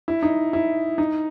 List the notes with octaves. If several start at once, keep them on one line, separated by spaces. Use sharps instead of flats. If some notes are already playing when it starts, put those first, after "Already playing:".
E4
D#4
E4
D#4